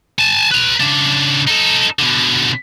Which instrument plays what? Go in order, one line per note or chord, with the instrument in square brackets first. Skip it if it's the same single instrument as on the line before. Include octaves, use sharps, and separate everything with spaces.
[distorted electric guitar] G#5 A5
B4 A#5
C#3 D4
D#4 A4
B2 D3